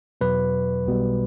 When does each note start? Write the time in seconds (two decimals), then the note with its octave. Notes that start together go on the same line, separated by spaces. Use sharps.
0.21 E2 B2 F#3 B4
0.86 B1 B2 G3